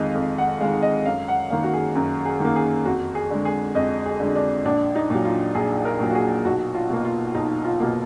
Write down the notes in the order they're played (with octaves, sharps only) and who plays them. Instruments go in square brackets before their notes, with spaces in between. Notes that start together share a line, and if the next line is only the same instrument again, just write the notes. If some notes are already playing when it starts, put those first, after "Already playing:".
Already playing: [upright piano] F2 D#3 G#3 D#5 F5
F2
F#5
D#3 G#3 F5
D#5
F#2 F5
F#5
D#3 A#3 F5
F#4
G#4
F#2
G#4
D#3 A#3
G#4
F2 F#4
G#4
D3 G#3
G#4
F2 D#5
G#4
D3 G#3
D4
A#1 D4
D#4
A#2 F#3
F4
A#1 G#4
A#4
A#2 F#3
F#4
G#4
B1 F#4
F4
B2 A#3
F4
B1 D#4
F4
B2 A#3